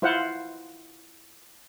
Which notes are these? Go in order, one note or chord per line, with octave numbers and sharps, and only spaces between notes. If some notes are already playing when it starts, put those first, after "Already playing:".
E4 F4 C5 F5 F#5